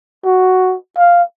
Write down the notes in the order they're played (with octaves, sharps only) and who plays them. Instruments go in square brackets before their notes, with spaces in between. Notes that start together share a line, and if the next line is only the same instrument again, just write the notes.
[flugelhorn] F#4
F5